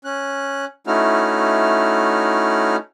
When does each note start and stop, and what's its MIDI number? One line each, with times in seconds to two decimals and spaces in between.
0.05 0.65 61
0.05 0.65 90
0.87 2.76 57
0.87 2.76 61
0.87 2.76 63
0.87 2.76 64
0.87 2.76 66
0.87 2.76 89